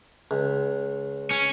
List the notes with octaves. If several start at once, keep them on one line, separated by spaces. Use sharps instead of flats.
C#2
C#4